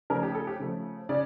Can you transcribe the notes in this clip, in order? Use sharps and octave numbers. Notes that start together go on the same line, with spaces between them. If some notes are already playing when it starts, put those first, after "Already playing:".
C#3 F3 A3 A#4
G4
A4
G4
C#3 F3 A3
C#3 D5